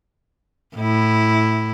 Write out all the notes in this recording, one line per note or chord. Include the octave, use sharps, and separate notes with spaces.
A2 E4